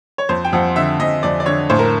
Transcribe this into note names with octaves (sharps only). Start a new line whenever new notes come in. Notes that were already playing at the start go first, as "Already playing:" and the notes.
C#5
F2 C5
G5
F2 F#5
D3 E5
F2 D#5
F2 D5
D5
D3 C#5
A2 C5
A#4